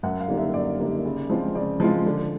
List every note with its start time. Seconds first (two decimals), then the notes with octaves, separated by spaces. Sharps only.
0.03 F#2 F#5
0.20 F5
0.28 D3 G3 A#3 D#4
0.38 E5
0.54 F#2 D5
0.79 D3 G3 A#3 D#4
1.05 C#3
1.30 F3 G#3 C4 F4
1.55 C#3 D5
1.80 F3 G#3 C4 F4
2.06 D3